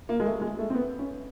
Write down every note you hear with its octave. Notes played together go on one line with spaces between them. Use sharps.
A#3
G#3
A3
G#3
A3
C4
B3
C#4